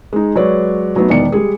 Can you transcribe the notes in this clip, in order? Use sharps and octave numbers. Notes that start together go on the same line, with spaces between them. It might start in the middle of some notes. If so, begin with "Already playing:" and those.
G#3 D#4
F#3 G#3 B4 C#5 D5
F#3 A3 B3 D#4
E1 B2 D#3 D5 C#7
G3 G#3 G#4